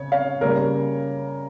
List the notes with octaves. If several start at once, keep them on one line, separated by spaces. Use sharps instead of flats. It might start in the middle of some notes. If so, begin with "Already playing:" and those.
Already playing: C#3 C#5
C#5 F5
C#3 G3 A#3 A#4 C#5